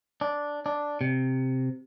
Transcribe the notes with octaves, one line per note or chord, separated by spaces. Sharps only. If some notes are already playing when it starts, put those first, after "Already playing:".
D4
D4
C3